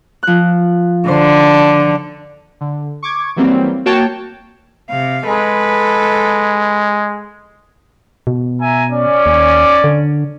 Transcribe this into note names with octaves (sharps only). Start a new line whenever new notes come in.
F3 F#6
D3 C5 C6
D3
C#6 D6 G#6
E3 F#3 G3 A#3 C4
A#3 F#4 C#5 G5 A5
C3 F5
G#3 A4 B4
B2
E5 G#5 A#5
C#4 D5
D#2
D3